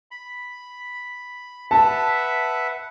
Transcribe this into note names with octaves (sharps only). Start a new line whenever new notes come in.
B5
B4 E5 F#5 A5